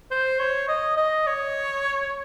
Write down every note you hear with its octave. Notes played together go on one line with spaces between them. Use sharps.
C5
C#5
D#5
D#5
C#5